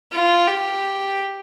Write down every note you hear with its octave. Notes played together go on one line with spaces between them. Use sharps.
F4
G4